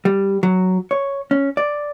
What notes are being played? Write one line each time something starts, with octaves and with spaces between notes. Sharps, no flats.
G3
F#3
C#5
C#4
D5